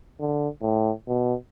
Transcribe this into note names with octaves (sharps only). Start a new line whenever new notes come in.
D3
A2
B2